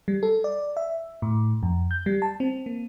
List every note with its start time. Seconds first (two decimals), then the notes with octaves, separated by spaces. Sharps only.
0.08 G3
0.23 A4
0.44 D5
0.77 E5
1.22 A2
1.63 F2
1.91 G6
2.06 G3
2.22 A5
2.40 C4
2.66 A#3